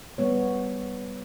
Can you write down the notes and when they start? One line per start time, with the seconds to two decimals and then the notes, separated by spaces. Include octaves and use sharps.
0.18 G3 B3 C#5